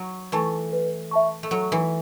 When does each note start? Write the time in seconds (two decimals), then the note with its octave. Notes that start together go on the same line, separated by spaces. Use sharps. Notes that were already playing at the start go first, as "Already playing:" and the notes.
Already playing: F#3
0.32 E3 A3 A5 C#6
0.73 B4
1.11 E5 A5 C#6
1.43 A3
1.51 F#3 A4
1.72 E3